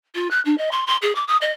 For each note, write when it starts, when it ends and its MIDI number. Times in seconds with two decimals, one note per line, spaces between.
0.15 0.28 65
0.30 0.40 90
0.45 0.57 62
0.58 0.69 75
0.71 0.84 84
0.86 0.96 84
1.02 1.14 68
1.15 1.24 86
1.27 1.37 87
1.41 1.51 75